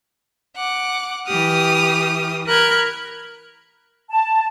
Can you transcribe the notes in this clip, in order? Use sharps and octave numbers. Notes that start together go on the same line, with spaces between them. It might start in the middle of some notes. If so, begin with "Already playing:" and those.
F#5 D6
E3 G4 D#6 F6
A#4 B5 F6 F#6 G#6
A5